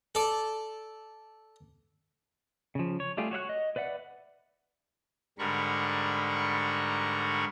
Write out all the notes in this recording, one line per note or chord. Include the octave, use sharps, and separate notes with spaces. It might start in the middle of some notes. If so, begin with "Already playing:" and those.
A4 D5
C#3 F3
C#5
G3 A3 F4 G4 G#4
F#4 C#5 E5 F#6
D#5
B4 D5 E5 F#5
G#2 D3 G3 A#4 B5 C#6